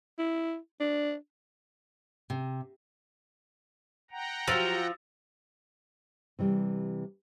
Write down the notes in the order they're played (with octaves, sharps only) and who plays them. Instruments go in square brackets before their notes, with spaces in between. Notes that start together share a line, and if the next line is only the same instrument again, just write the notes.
[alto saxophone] E4
D4
[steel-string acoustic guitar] C3
[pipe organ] F#5 G5 A#5
[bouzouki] F3 [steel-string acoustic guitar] F#3 F4 G4 [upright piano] E6 A6 A#6
[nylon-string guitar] C3 E3 G3